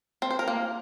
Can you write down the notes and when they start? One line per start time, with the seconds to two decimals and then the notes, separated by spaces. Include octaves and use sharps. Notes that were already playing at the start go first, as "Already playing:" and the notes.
0.22 C4
0.31 C5
0.39 A#4
0.48 A#3